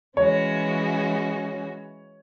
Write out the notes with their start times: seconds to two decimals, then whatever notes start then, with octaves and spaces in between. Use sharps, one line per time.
0.17 E3 G#3 C#4 F#4 C#5